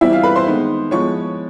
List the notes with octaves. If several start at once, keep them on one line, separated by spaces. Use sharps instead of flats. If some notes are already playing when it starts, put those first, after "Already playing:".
E3 G3 C4 E4 E5
F4 F5
B4 B5
C5 C6
D#3 G#3 B3
F3 G#3 B3 E4 C#5 C#6